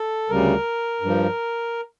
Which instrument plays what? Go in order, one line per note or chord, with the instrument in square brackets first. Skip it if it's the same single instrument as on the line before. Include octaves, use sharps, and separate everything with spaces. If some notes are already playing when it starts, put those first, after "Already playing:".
Already playing: [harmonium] A4
D2 C#3 G3 A#4
G2 F3